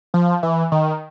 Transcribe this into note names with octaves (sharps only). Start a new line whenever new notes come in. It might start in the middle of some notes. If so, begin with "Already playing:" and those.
F3
E3
D#3